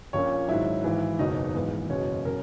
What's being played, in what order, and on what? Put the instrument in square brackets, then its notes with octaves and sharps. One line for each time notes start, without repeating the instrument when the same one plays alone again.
[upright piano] A#1 A#2 A#3 C#4 C#5
G#2 D#3 F#3 E4
G#1 G#2 E3
F#1 E2 B2 F#3 D#4
G#1 G#2 E3 B3
F#1 E2 B2 G#3 C#4 C#5
B2 F#3 C#4 A#4